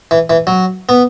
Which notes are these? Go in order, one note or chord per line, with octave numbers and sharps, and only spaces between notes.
E3
E3
F#3
B3